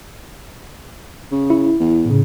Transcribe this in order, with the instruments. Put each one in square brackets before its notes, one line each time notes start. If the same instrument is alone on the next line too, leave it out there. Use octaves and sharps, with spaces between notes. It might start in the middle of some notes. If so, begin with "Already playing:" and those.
[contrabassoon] C#3
[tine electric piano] E4
[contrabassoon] E2
[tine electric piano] A2 C#3